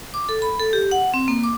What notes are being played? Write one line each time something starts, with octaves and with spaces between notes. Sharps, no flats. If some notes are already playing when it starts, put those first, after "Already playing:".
D6
A4
B5
A4
G4
F#5
C4
A#3
D6